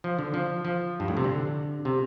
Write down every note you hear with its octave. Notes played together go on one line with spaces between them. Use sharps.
F3
D3
F3
F3
G2
A2
C3
D3
C3